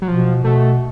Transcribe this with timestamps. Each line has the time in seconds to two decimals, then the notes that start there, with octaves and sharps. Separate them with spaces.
0.02 F#3
0.08 B2 F3
0.44 B2 A3